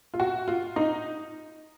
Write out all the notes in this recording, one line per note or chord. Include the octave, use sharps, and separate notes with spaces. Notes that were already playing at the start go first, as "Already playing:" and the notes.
F4
F#4
F4
D#4